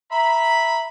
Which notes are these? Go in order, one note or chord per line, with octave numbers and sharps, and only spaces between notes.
E5 A#5 B5